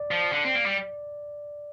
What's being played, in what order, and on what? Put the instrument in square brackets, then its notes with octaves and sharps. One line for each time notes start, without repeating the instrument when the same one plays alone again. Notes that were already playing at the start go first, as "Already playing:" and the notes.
Already playing: [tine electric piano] D5
[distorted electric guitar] F3
D3
C4
A#3
G3